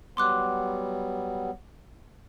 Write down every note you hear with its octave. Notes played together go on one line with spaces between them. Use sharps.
F#3 G3 B3 C6 D6 F#6